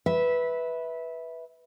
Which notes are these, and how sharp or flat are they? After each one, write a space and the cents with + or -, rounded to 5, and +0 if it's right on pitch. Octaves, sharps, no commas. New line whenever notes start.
B4 -5 E5 -15